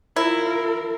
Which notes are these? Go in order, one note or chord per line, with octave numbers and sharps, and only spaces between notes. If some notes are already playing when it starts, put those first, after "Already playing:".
E4 F4 A#4